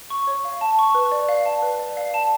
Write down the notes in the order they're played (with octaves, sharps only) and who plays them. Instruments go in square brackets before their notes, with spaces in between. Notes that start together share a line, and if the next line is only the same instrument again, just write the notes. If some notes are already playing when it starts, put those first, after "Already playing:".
[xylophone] C#6
C#5
F5
A5
C#6
B4
D5
F5
A5
B4
D5
F5
A5